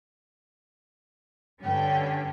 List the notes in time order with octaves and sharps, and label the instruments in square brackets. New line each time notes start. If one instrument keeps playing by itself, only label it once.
[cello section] G2 D3 C#4 [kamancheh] G5